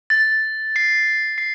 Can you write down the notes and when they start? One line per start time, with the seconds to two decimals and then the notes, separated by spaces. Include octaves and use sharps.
0.10 A6
0.76 C7
1.38 C7